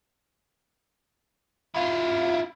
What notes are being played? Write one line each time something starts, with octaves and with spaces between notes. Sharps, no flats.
E4 F4